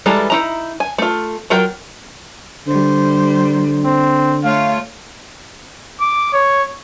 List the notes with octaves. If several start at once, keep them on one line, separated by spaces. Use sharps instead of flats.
E3 G3 G#3 A4 A#5
D#4 E4 A#5
G#5
A3 F4
F#3 F4 A#4 G5
D3 G3 C5
C4
A3 F4 C#5 F5
D6
C#5